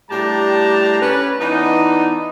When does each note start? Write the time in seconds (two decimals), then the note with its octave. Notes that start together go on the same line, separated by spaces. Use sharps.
0.10 A2 G3 D4 G4 A5 A#5
1.01 C#4 B4
1.40 E3 B3 D4 D#4